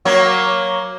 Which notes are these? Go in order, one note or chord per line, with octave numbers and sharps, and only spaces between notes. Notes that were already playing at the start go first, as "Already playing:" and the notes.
F#3 A#3 C#5